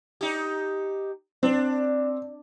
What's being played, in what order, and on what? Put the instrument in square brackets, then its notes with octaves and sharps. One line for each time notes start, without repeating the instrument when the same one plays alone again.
[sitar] D#4 G4
[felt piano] C4 [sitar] D4